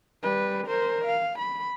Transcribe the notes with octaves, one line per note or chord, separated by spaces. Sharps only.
G3 B4
A#4 C5
F5
B5